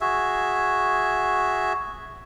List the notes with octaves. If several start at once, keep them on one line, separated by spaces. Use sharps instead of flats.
F#4 G#4 E5